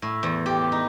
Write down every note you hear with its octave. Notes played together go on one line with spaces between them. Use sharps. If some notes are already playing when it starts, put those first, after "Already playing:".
A2
E2
G4
D#4